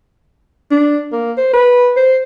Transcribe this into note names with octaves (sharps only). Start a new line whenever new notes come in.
D4
A#3
C5
B4
C5